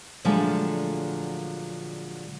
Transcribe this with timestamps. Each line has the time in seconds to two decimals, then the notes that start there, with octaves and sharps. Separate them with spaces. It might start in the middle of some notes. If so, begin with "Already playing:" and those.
0.25 A#2 D3 F3 F#3 G#3 A3